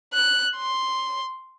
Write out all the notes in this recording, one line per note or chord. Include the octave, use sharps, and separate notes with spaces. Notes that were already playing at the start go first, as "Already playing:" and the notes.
F#6
C6